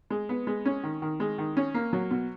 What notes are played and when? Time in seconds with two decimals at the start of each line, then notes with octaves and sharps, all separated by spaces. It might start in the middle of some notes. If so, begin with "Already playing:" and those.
0.10 G#3
0.29 B3
0.47 G#3
0.65 C#4
0.83 D#3
1.02 D#3
1.20 G#3
1.38 D#3
1.57 C#4
1.74 A#3
1.93 F#3
2.11 B2